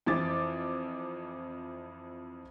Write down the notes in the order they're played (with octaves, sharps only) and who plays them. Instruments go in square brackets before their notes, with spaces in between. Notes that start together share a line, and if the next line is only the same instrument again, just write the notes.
[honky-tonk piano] F2 E3 D6 A6